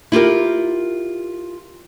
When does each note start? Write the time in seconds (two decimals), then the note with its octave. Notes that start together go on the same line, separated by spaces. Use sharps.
0.12 E4 F4 G4 A#4